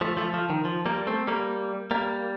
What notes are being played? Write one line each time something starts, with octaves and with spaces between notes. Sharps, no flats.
F3 A3
F3 A3
F3
D#3
F3
G3 A#3
A3 C4
G3 A#3
G3 A#3